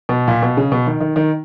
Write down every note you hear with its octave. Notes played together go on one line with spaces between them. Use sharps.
B2
A#2
B2
C#3
B2
D#3
D#3
D#3